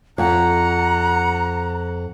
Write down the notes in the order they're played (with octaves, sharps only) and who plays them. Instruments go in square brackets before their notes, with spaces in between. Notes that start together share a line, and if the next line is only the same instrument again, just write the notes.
[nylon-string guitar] F2 [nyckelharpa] F#5 [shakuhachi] A#5